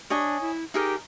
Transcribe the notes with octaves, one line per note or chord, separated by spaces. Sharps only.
D4 C#5 D#5 G#5
E4
D#4 G4 G#4 A#4